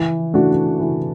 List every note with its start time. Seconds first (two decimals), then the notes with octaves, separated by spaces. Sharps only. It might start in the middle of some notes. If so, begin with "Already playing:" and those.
Already playing: E3
0.33 A3 D4 F#4
0.80 E3